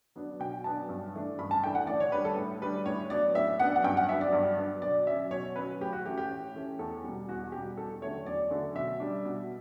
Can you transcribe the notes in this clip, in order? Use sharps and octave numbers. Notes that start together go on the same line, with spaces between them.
F#3 B3 D4
B2 G5
F#3 B3 D4 A5
G2
E3 A3 D4
G2 B5
A5
E3 A3 D4 G5
F#5
A2 D5
C#5
G3 D4 B4
A4
A2
G3 D4 B4
A2 C#5
F#3 B3 D4 D5
A2 E5
F#3 B3 D4 F#5
F#5
G2 G5
F#5
F#3 B3 D4 E5
D5
G2
F#3 B3 D4
B2 D5
F#3 C#4 E5
B2 C#5
F#3 C#4 B4
A2 G4
F#4
E3 A3 C#4 G4
G4
A2
E3 A3 C#4
E2 A4
B2 G3
E2 F#4
B2 G3 G4
E2 A4
D3 F#3 A3 C#5
E2 D5
D3 F#3 A3
B2 E5
G3 D4
B2